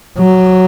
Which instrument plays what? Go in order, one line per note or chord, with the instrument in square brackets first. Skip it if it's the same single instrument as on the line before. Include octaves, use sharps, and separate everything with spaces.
[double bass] F#3